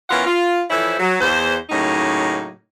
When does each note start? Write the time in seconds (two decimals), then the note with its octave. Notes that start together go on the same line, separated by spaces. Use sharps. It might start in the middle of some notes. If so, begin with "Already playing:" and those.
0.10 E3 B3 C#4 F4 A#4 F#5
0.26 F4
0.70 E3 F3 E4 A4 C5 C#5
0.99 F#3
1.20 E2 C5
1.70 A2 C#3 F#3 A#3 D#4